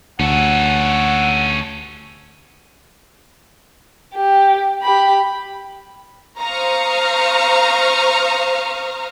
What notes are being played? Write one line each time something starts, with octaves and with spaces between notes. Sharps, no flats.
D2 C#4 A4 F#5
G4
G4 B5
C5 F5 A#5 C#6 D#6 F6